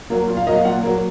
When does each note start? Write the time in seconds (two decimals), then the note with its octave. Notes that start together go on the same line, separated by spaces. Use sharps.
0.10 F#3 A#3
0.28 A#2
0.37 F5
0.47 F#3 A#3 D#5
0.56 F5
0.65 A#2 F#5
0.83 F#3 A#3